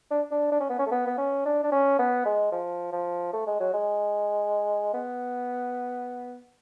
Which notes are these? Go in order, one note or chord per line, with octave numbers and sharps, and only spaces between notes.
D4
D4
D4
C#4
B3
C#4
A3
B3
B3
C#4
D4
D4
C#4
B3
G#3
F3
F3
A3
G#3
F#3
G#3
B3